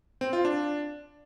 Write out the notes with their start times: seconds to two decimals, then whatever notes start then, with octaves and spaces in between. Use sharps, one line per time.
0.21 C4
0.33 F4
0.45 D4